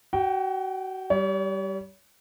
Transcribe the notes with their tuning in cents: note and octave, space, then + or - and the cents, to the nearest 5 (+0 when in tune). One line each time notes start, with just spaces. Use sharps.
F#4 +30 G5 -5
G3 -10 C#5 +40